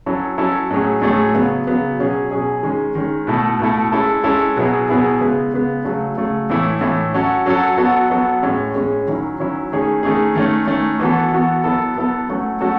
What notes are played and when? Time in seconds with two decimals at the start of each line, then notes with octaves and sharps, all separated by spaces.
0.06 F#3 C#4 E4 A4
0.38 F#3 C#4 E4 A4
0.71 A2 F#3 A3 C#4 G#4
1.02 A2 F#3 A3 C#4 G#4
1.34 C#3 F#3 B3
1.67 C#3 F#3 B3
1.99 B2 F#3 C#4 G#4
2.31 B2 F#3 C#4 G#4
2.63 D#3 G#3 C#4
2.95 D#3 G#3 C#4
3.27 B2 A3 E4 A4
3.59 B2 A3 E4 A4
3.92 G#3 C#4 E4 A4
4.24 G#3 C#4 E4 A4
4.56 B2 F#3 B3 E4 G#4
4.89 B2 F#3 B3 E4 G#4
5.20 C#3 G#3 B3
5.54 C#3 G#3 B3
5.85 C#3 F#3 A3
6.17 C#3 F#3 A3
6.50 A2 E3 A3 E4
6.81 A2 E3 A3 E4
7.14 F#3 C#4 F#4 A4
7.46 F#3 C#4 F#4 A4
7.78 F#3 B3 F#4 A4
8.10 F#3 B3 F#4 A4
8.43 A2 G#3 C#4
8.75 A2 G#3 C#4
9.07 D#3 F#3 C#4 E4
9.40 D#3 F#3 C#4 E4
9.72 D#3 A3 C#4 G#4
10.03 D#3 A3 C#4 G#4
10.35 D#3 A3 C#4
10.68 D#3 A3 C#4
11.00 E3 B3 F#4 A4
11.32 E3 B3 F#4 A4
11.64 F#3 B3 E4 A4
11.96 F#3 B3 E4 A4
12.29 F#3 A3 C#4 F#4 A4
12.61 F#3 A3 C#4 F#4 A4